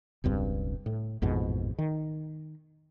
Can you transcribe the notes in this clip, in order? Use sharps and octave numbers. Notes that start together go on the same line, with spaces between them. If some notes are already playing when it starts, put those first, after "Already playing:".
E1 C#2 G2 C4
A2
A1 F2 G#2 B2
D#3